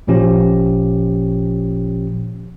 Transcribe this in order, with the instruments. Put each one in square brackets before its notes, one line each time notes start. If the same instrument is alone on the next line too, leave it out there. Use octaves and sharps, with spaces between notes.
[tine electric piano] G#1 A#2 F3 C#4 G4